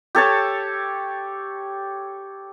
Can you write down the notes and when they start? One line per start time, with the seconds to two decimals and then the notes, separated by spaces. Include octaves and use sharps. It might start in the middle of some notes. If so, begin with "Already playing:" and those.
0.15 G4 A4 C#5 A5